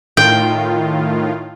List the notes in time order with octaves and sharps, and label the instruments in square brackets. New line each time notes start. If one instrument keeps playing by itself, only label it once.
[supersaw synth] A2 D#3 F4 [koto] G5